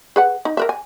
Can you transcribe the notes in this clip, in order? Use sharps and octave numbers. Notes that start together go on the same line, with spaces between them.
G#4 B4 F#5
D#4
A#4 B4 E5
G#5